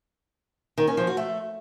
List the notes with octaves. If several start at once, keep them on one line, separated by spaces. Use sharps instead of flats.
D#3
C#4
F3
F#4
A3